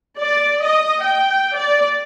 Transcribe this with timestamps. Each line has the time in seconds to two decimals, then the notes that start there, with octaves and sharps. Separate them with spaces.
0.19 D5
0.63 D#5
1.03 G5
1.54 D5